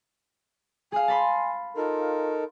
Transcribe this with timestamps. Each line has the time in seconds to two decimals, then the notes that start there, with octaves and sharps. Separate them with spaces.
0.92 G#4 F5 G#5
1.08 A5 B5 C6
1.76 D#4 F4 A4 A#4